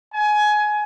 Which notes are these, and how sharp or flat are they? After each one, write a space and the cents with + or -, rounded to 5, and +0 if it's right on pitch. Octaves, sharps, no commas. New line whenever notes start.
G#5 +20